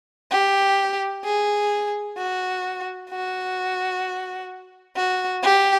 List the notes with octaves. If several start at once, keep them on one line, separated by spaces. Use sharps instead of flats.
G4
G#4
F#4
F#4
F#4
G4